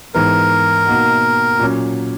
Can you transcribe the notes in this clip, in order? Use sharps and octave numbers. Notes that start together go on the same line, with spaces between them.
G#2 E3 B3 A#4
B2 A#3 D#4 F#4
A#2 F#3 C#4